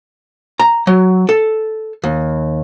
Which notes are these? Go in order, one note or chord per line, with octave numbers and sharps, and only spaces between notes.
A#5
F#3
A4
D#2